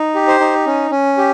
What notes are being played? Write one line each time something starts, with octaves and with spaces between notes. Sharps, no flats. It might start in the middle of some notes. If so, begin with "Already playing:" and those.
Already playing: D#4
G4
C5
D#4
C#4
C#4
G4